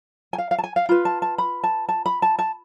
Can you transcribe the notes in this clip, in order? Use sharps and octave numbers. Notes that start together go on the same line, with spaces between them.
G#5
F5
F5
A5
G#5
F5
F4 B4 B5
A5
A5
B5
A5
A5
B5
A5
A5